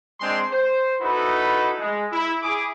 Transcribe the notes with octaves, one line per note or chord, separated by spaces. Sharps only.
G#3 C4 D4 G#4 G5 C6
C5
D#4 E4 F#4 A4 B4
G#3
E4
E4 G#4 D6